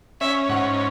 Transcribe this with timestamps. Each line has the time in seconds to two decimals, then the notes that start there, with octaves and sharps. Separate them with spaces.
0.21 C#4 E5
0.49 G#2 F#5